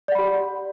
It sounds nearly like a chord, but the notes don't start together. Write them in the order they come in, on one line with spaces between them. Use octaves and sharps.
D5 F#5 B5 G4